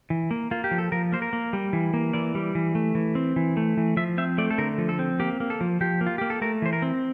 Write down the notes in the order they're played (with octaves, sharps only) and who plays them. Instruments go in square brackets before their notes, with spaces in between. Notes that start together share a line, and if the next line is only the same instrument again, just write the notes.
[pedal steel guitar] E3
A#3
A#3 F4
G4
F3
A4
F3 A#4
A#3 C5
A#4
A#3
G3
E3
A#3
E3 D5
G3
E3
A3
E3
C4
E3
A3
E3
F3 E5
C4 E5
A3 D5
A4
D3 A#4
F3
A4
C4
A#3 G4
A#3
A4
F3
F3 G4
A#3
F4
A#3 G4
A4
A3 A#4
E3 C5
A#4
C4